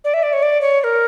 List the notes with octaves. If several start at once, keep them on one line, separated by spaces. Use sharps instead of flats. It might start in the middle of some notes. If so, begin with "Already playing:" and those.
D5
E5
D5
C#5
D5
C#5
C#5
A#4